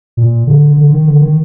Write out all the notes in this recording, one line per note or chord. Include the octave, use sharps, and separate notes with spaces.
A#2
D3
D3
D#3
D3
D#3